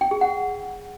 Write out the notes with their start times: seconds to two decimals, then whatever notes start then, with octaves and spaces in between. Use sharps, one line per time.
0.01 G5
0.11 G#4
0.21 F#5